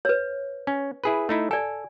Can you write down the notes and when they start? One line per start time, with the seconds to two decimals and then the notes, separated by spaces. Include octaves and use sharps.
0.05 B4 C#5
0.67 C#4
1.04 E4 G#4 B4
1.29 A3 D#4 E4
1.51 A4 D5 G#5